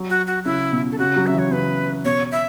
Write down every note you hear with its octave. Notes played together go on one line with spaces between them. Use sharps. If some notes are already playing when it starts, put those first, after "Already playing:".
Already playing: F#3
F#4
F#4
C#3 E4
B2
A4
C#3 F#4
F#3
C#3 E5
E3
C#5
C#3 B4
B2 C#5
E5